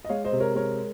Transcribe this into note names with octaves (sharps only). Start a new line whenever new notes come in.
D#5
G#3 C#5 F5
C5 D#5
C3
A#4 C#5
G#3 A#4 C#5